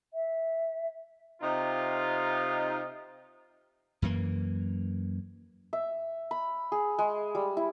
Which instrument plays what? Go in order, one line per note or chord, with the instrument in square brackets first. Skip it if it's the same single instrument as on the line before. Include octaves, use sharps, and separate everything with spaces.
[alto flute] E5
[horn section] C3 D#4 F4
[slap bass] F#2 E3 A#3
[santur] E5
B5
G#4
G#3
G3
E4